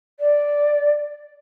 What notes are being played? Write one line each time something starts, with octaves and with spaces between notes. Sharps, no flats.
D5